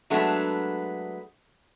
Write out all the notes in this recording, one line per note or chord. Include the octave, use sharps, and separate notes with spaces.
F#3 G#3 A3 B3 D4